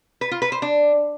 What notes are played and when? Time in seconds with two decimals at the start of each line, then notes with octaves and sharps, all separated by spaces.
0.21 B4
0.31 F4
0.42 B4
0.52 C5
0.62 D4